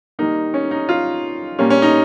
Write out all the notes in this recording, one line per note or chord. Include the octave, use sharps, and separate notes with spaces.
D#3 G3 A#3 D#4
C#4
D#4
F4
A#2 G3 A#3 C#4
C#4
D#4